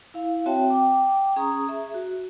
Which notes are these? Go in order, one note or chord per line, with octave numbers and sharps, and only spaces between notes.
E4 F5
C4 F#4 C#5 E5 G5 A5
G5 D6
C#4 G#4 A#5 C#6 D#6
G#4 E5
F#4